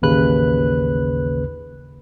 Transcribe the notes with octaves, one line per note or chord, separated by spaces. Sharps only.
A1 D#2 C#3 B4 F#6